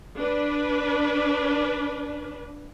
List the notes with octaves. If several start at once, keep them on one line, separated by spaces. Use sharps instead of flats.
D4 B4